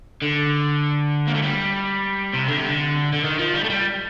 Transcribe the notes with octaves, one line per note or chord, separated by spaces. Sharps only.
D3
A#3
A3
G3
C3
D3
C3
D3
D3
D#3
F3
G3
A3
G3